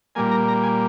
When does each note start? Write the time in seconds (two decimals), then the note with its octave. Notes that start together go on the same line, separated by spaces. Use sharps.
0.15 A#2 G3 A#3 G#5
0.31 A#5
0.48 A#5
0.63 G#5